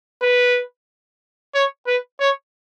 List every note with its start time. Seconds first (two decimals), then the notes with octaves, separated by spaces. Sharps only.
0.22 B4
1.54 C#5
1.87 B4
2.20 C#5